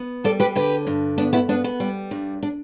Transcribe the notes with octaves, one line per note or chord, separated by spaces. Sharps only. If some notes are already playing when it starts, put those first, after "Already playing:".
Already playing: B3
G3 A4 D5
G4 B4
D3 G4 B4
G2
B3 D4
B3 E4
B3 D4
B3
G3
G2
D4